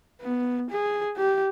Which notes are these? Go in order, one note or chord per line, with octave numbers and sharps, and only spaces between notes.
B3
G#4
G4